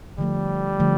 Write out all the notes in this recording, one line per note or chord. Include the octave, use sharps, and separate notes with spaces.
D3 F3 G3 A3
D3 F3 A3